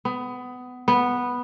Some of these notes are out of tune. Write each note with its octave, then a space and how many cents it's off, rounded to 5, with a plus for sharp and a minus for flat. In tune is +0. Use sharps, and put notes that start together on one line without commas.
B3 +20
B3 -5